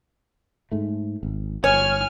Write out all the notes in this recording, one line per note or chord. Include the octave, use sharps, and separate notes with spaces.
G#2 A3
G#1
G1 C#5 G#5 F6